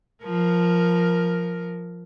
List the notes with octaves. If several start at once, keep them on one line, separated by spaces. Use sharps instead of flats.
F3 A#4